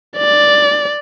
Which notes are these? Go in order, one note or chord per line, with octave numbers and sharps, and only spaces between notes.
D5